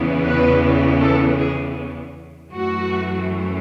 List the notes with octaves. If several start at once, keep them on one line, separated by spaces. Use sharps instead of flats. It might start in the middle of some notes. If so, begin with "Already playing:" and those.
Already playing: E2 C#3 E3 B3
B4
A4
G#4
F#2 E3 A3 F#4